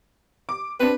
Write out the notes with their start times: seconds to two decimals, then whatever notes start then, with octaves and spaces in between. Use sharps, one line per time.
0.49 D6
0.80 C4 D4 B4